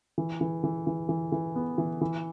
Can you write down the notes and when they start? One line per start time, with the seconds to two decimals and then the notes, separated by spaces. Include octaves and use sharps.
0.18 E3
0.41 E3
0.64 E3
0.87 E3
1.09 E3
1.32 E3
1.56 B3
1.78 E3
2.01 E3